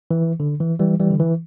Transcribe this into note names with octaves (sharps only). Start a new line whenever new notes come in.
E3
D3
E3
E3 G3
E3 G3
D3
E3